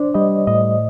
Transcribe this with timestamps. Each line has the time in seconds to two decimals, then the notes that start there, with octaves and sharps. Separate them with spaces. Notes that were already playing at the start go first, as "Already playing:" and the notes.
Already playing: D4 C5 D5
0.14 G3 D#5
0.47 A2 D#5